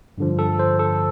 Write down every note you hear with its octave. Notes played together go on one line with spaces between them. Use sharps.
G2 D3 F3
A4
C5
A4